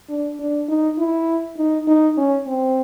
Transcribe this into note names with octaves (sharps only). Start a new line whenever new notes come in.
D4
D4
D#4
E4
D#4
D#4
C#4
C4